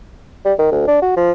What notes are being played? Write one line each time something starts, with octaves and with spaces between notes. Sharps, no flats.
G3
D#3
D2
D4
F#4
F3